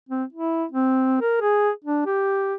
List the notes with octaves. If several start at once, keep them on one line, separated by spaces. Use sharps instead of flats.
C4
E4
C4
A#4
G#4
D4
G4